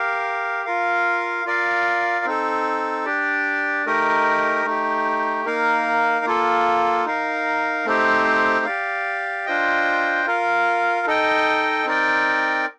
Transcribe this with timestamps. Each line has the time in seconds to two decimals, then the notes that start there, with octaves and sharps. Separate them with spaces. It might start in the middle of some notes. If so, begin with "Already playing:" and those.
Already playing: G4 A#4 F5
0.65 F4 A#4 F5
1.45 F4 A#4 D5 F5
2.25 C4 D#4 A4
3.05 D4 G4 D5
3.86 A3 D#4 G4 A#4 D#5
4.65 A3 D#4 G4
5.45 A#3 D#4 A#4 F5
6.25 A#3 F4 A4
7.05 D#4 A#4 F5
7.85 A3 C4 D#4 G4 C5
8.65 G4 D5 F5
9.46 D4 F4 C5 D#5 G5
10.25 F4 A#4 F5
11.07 D#4 A4 D#5 G5
11.86 C4 D#4 A#4 D5 G5